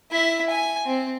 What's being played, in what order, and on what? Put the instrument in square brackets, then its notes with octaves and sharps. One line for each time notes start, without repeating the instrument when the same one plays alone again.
[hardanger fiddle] E4 E5
G#5
C4